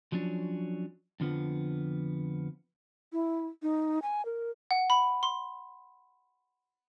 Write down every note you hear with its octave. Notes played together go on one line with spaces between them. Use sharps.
F3 F#3 C#4 D4
F2 D3 F3 B3
E4
D#4
G#5
A#4
F#5
B5
C6